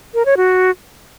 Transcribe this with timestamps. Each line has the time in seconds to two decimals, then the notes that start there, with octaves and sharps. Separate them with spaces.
0.14 A#4
0.26 C#5
0.37 F#4